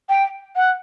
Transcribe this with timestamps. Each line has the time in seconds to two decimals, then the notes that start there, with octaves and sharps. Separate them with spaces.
0.09 G5
0.56 F#5